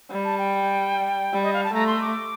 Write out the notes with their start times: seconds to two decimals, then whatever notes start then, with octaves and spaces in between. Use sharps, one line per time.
0.10 G3
0.25 A5
0.38 G5
1.33 G3
1.43 D#5
1.53 F5
1.63 A5
1.73 A3 A#5
1.87 C6
2.01 D6